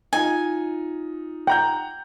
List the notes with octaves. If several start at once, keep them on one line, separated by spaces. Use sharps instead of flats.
D#4 F4 G#5
F#5 G5 A#5 G6